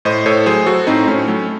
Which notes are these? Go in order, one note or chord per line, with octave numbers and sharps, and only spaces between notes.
A2 C5 D#5
A2 A4 C#5
F#3 G#4 C5
F#3 F#4 A4
A2 C4 D#4
A2 A3 C#4
F#3 A3 C#4